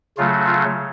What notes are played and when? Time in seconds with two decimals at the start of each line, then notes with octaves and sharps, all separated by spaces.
0.18 C#3 F#3 A3 F4
0.46 F4